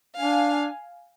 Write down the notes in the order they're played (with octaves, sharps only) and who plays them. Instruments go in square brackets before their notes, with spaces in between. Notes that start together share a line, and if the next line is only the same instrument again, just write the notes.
[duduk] D4 [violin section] F5 G#5